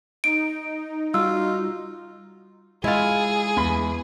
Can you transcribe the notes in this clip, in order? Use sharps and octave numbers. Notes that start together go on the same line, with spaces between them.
D#4 D7
G3 F4 F#4 E6
G#3 E4 F4 G#4
E2 B5